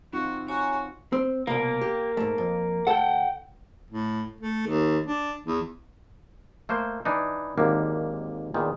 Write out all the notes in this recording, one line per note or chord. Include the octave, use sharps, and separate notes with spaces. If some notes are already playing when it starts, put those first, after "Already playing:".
C4 D#4 F4 F#4
F#4 C#5 G#5 A#5
C4
C2 B2 A#3
G4
G#2 A3
F2
D2 A4 F#5 G5 A5
A2
A3
D#2
D4
E2
A3 A#3 C5
E3 D4 D#4
G#1 D#2 D3 A#3
E2 A#2 D#3